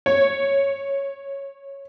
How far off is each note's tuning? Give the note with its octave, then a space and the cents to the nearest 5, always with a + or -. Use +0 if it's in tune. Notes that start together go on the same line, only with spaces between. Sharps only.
C#5 -10